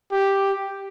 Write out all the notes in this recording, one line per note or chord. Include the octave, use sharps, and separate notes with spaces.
G4